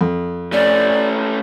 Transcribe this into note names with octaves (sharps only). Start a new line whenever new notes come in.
F2
A3 C#4 D5